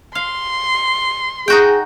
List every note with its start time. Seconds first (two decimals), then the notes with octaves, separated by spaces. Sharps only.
0.15 F5 C6
1.48 D#4 F#4 G#4 G5